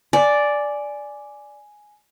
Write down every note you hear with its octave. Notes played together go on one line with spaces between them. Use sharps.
D5 G#5